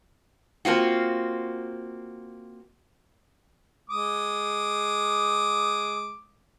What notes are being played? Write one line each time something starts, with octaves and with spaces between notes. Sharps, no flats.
A#3 C4 F4 F#4
G#3 D6 D#6